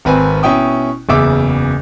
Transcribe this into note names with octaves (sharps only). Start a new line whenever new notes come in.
G#1 C4 B4 G#5
B2 C#4 E4 G5 D#6
F#1 E2 C#3 E5 D6 E6